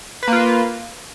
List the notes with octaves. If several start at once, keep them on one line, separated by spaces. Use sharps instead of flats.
A#3 F4 B4